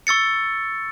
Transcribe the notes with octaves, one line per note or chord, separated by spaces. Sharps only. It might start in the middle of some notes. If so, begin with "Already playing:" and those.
C#6 E6 A6 C#7